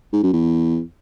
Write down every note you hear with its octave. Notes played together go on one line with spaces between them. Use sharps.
G#2
F#2
E2